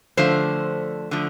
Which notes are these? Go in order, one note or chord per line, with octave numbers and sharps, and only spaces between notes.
D3 F3 A3 C5
D3 F3 A3